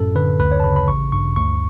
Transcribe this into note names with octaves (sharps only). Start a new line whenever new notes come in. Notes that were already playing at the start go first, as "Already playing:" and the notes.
Already playing: F#2 A2 A4
D3 B4
D2 B4
C#5
A5
C#3 B5
B5
A1 C#6
G2 C#6
D2 C#6